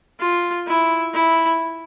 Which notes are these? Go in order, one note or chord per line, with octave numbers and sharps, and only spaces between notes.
F4
E4
E4